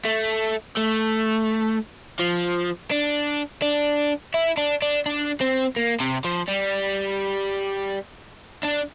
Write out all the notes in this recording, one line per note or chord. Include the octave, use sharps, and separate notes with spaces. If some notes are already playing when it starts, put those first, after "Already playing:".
A3
A3
F3
D4
D4
E4
D4
D4
D4
C4
A#3
C3
F3
G3
D4